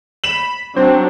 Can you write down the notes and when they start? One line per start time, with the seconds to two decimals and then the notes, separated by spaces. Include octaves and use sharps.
0.24 B5 E7 F#7
0.77 F#3 C4 D4 C5